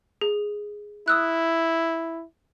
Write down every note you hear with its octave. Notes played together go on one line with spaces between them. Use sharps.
G#4
E4 D#6 E6 F#6